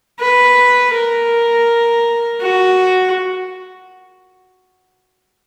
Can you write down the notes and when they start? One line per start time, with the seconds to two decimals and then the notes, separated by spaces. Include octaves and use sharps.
0.20 B4
0.94 A#4
2.41 F#4